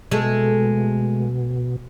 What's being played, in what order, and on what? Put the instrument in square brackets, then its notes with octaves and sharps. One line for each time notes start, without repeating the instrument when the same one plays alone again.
[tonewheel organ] B2 [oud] G#3 A3